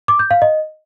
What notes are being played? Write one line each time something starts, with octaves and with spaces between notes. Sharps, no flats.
D6
G6
F5
D#5